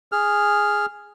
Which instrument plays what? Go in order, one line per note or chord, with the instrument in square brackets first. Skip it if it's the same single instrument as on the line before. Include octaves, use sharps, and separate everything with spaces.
[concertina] G#4 F6